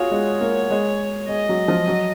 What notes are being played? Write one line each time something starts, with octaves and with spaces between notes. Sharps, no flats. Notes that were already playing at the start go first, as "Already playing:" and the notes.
Already playing: F4 F#4 G#4 C#5
G#3
A#3
G#3
G#3 D#5
F#3
F3
F#3